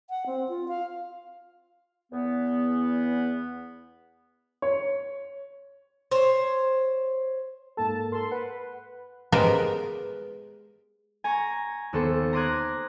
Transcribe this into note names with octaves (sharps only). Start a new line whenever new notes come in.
F#5
C4
F4
F5
E2 B3
C#5
C5 C#5
G#2 A#3 A4 A5
A4 A#4 C6
B4 F#5
G#3 B3 G4 A#4 C5
G#5 A#5 C#6
D#2 B3 A4 C5 C#7
A#5 C6 D6 D#6 F#6 G#6